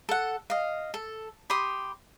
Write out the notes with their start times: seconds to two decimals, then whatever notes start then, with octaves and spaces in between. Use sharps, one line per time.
0.09 A4 F#5
0.50 D#5 F5
0.94 A4
1.50 G4 B5 C6 D#6